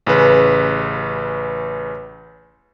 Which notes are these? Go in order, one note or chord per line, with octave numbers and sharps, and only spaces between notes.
A1 C#3 B4